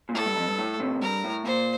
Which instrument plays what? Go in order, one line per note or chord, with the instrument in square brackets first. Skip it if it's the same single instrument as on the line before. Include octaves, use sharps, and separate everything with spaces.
[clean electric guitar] A#2
[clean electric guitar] A2 [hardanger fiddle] A4
[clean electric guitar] G2
F2
G2
A2
A2 C3
[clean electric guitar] G2 [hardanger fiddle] A#4
[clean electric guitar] A2
[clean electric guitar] A#2 [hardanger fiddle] C5